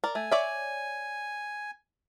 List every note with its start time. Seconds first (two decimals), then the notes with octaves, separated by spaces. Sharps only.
0.04 A#4 D5
0.15 A3 G#5
0.31 C#5 D5 E5